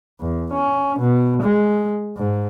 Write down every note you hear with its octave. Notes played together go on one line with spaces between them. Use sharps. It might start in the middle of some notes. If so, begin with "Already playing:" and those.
E2
C#4
B2
G#3
G#2